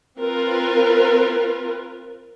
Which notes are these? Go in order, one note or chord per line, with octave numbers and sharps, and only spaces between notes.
C4 F4 A#4 B4